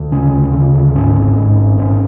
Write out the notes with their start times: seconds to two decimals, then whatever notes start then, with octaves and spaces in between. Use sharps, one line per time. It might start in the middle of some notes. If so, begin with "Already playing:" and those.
Already playing: D2
0.11 C#3 C#4
0.33 D2
0.53 C#3
0.74 D2
0.95 G#2 C#4
1.16 G#1
1.37 G#2
1.57 G#1
1.78 G#2 C#4